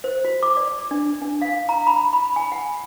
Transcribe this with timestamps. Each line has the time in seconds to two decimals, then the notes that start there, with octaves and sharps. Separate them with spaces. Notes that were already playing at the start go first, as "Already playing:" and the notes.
0.04 C5
0.25 F#4
0.43 D6
0.57 D5
0.91 D4
1.21 D4
1.42 F5
1.69 A#5
1.87 B5
2.13 B5
2.36 G#5
2.52 F#5